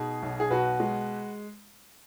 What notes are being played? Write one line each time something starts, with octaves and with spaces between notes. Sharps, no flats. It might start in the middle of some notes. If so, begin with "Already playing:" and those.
Already playing: B2 D#4 G#4
B1
G#4
B2 F#4 B4
G#3